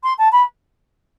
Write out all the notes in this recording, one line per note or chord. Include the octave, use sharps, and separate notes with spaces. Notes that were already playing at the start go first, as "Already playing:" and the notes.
C6
A5
B5